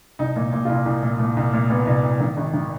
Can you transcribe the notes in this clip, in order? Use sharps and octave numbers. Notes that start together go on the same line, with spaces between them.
C2 D#4
A#2
A#2
F4
C2 E4
C2
A#2
A#2
C2
A#2
A#2 B3
C2
C2
D#3
G#1
D#3